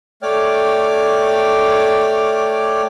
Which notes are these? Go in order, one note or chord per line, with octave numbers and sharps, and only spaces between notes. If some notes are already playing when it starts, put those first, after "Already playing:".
A3 C#5 D5 G5 D6 F6